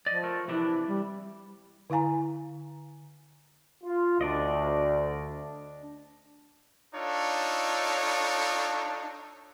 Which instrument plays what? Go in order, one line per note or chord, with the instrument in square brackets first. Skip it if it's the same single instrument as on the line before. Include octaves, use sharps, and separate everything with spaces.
[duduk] F3 [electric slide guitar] D5 D#5
[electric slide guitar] A3 A#4
[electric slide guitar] C3 E3 D4 [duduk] E4
[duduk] G3
[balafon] D3 E4 F5 G#5 A#5
[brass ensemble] F4
[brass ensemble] D2 [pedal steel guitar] D4 D5 D#5
[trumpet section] D4 D#4 F4 A4 C#5